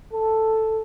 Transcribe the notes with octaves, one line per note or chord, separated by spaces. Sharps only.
A4